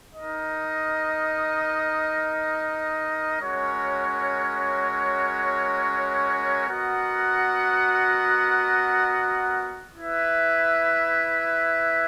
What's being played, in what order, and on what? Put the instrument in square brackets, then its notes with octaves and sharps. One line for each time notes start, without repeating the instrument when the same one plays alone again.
[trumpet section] D#4 A#4 D#5
G#3 C#4 F#4 A#4 C#5
B3 F#4 A#4 D#5 F#5
E4 B4 E5